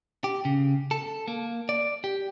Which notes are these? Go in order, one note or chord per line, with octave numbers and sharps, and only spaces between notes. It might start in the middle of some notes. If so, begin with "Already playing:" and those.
G4
C#3
A4
A#3
D5
G4